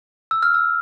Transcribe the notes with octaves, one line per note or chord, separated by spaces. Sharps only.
E6
F6
E6